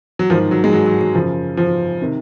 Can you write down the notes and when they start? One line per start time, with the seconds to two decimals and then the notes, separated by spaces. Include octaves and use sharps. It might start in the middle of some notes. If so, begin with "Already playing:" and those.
0.19 F#3
0.30 G#2 D#3 F3
0.51 F#3
0.64 G#3
0.73 F#3
0.86 F#3
1.01 F#3
1.15 F#2 C#3 F3
1.57 F3
2.02 C3 D#3